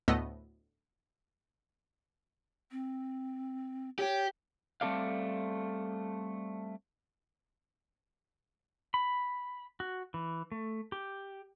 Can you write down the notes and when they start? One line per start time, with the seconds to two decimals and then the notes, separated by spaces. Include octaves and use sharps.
0.08 D2 A2 A3 B3 D#5 E6
2.71 C4
3.99 G4 C#5
4.81 G3 A3 C4 A4 D5 F5
8.94 B5
9.80 F#4
10.14 E3
10.52 A3
10.92 G4